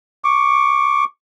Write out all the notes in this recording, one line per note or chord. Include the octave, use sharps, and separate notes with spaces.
C#6 D6